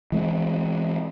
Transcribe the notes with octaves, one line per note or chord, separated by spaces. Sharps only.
E3 G#3 C4